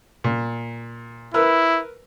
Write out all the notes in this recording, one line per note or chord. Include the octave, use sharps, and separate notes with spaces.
A#2
E4 A#4 B4 E6